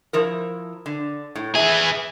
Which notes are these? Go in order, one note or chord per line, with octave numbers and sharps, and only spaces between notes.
F3 E4 A#4
D3
A2
E3 G#4 E5